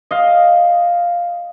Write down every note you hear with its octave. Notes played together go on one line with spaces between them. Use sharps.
D#5 F5